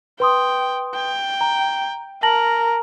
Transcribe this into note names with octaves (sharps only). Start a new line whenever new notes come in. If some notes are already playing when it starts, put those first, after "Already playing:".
B4 G5 C6 D#6
G5
A#5
A#4 A5 A#6 F#7